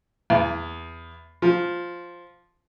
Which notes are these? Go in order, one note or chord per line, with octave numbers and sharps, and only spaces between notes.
E2
F3